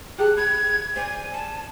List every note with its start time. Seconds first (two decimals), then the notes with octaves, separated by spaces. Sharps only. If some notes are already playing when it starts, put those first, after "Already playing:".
0.18 G4 G#4 A5 F#6
0.37 B5 G#6
0.96 C5 D5 G#5
1.33 A5